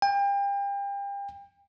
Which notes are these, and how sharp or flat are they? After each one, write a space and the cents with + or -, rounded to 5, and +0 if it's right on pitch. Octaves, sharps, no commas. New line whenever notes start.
G5 +35